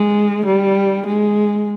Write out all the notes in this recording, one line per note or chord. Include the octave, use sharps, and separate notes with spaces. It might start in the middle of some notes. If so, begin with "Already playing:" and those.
Already playing: G#3
G3
G#3